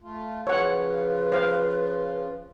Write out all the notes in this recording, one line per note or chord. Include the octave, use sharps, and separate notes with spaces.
A3 F4
C#3 F3 F4 B4 C#5 F#5
C5 F5